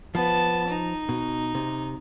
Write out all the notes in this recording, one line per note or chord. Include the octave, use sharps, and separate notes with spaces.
F3 B3 A5
D#4
B2
C3